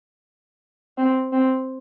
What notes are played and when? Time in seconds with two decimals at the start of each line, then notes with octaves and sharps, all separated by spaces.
0.98 C4
1.32 C4